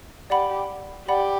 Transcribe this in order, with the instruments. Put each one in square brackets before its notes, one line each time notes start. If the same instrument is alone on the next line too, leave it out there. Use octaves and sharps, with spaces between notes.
[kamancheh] G4 [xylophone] D5 F#5 B5
[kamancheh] G4 [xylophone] D5 F#5 B5